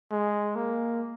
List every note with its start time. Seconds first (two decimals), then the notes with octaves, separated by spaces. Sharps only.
0.12 G#3
0.55 A#3